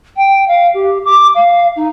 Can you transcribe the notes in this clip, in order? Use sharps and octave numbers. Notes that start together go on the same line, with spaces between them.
G5
F5
G4
D6
F5
D#4